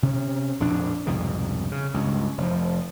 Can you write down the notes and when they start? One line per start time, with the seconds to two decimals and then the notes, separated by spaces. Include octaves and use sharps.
0.03 C3 C#4
0.60 A#1 F2 A2 D4
1.06 C2 F2 G#2 B2
1.72 C#3
1.94 C#2 G2
2.38 F1 F3